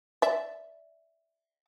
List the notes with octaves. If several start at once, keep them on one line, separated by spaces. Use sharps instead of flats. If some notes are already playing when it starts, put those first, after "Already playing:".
D5 E5